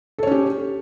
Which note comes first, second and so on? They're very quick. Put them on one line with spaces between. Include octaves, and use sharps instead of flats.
A4 C#5 C#4 G4